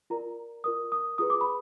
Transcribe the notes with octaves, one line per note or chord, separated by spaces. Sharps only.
F4 A#4 D5 A#5
F4 A#4 D5 D#6
D#6
F4 G#4 B4 D#6
D6
B5